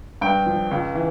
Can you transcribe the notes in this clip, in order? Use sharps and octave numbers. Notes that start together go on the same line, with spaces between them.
G2 G5
F3
C#2
E3